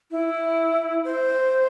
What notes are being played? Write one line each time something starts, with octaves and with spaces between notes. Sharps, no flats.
E4
C5